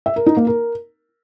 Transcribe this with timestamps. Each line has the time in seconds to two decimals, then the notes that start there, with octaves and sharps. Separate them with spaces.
0.06 E5
0.16 A#4
0.26 D#4
0.37 A#3
0.47 A#4